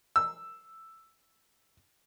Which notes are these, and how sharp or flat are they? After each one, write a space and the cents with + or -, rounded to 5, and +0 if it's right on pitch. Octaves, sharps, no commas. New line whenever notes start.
E6 +5